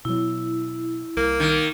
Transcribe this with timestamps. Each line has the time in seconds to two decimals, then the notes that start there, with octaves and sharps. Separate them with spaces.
0.05 B2 F#3 E4
1.17 C2 A#3
1.40 D#3